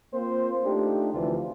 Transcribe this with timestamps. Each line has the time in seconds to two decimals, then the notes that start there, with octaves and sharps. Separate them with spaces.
0.14 A#3 C4 F4 C5
0.65 A3 D4 D#4 F4 G4
1.13 D2 C3 E3 F3 D4 F4